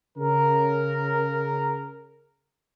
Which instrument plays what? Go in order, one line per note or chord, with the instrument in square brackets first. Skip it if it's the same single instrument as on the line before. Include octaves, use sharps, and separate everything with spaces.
[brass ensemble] C#3 A#4